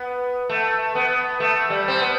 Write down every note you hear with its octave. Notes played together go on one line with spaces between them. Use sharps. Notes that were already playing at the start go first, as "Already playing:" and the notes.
Already playing: B3
A3
B3
A3
G3
C4
B3